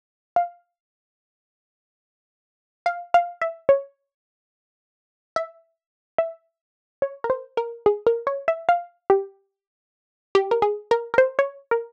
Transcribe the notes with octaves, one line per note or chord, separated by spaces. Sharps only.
F5
F5
F5
E5
C#5
E5
E5
C#5
A#4
C5
A#4
G#4
A#4
C#5
E5
F5
G4
G4
A#4
G#4
A#4
A#4
C5
C#5
A#4